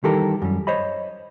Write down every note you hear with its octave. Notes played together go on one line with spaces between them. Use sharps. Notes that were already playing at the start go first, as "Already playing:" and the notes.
D#3 E3 G3 G4 A4 A#4
F#2 G3
C5 C#5 D#5 B5